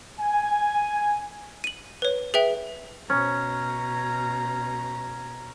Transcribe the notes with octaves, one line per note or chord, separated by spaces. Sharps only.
G#5
D#7 F#7
B4 C#5
G#4 B4 E5 G5
B2 C#4 A#5